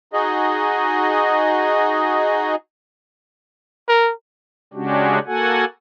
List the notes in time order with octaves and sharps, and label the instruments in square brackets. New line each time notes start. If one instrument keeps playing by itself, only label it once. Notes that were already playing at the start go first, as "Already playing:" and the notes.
[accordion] D#4 F#4 G#4 D#5
[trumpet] A#4
[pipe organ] C#3 G#3 C#4 D4 F#4 G4
A#3 F#4 A4 F#5 G#5